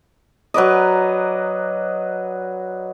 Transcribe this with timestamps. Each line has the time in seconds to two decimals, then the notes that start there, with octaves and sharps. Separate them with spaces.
0.54 F#3 B4 D5 D#5